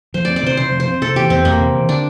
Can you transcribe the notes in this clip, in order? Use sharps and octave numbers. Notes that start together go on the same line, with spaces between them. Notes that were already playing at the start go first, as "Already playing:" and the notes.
F3 C5
C4 D5
D5
C3 C5
C3 C5
F3
C5
C4
C3 A4
E3 G4
E2 C4
E2 A#3
C3
E3
D3 D4